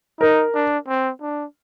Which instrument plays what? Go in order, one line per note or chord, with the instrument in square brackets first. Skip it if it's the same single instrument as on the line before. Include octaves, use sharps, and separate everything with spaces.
[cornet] D#4 [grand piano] A#4
[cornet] D4
C4
D4